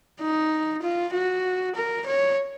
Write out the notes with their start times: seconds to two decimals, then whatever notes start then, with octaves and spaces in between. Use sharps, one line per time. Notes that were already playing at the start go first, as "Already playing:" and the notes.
0.21 D#4
0.82 F4
1.14 F#4
1.76 A#4
2.06 C#5